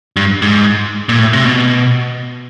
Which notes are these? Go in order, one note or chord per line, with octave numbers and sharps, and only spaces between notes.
G2
G#2
A#2
A2
C3
B2